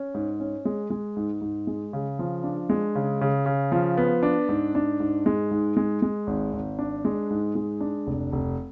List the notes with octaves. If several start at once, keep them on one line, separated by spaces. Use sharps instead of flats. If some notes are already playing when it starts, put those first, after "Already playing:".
Already playing: C#4
G#2
C#4
G#3
G#3
G#2
G#2
G#3
C#3
F3
D4
G#3
C#3
C#3
C#3
F3
B3
D4
G#2
D4
G#2
G#3
G#2
G#3
G#3
G#1
G#1
D4
G#3
G#2
G#3
D4
F1
F1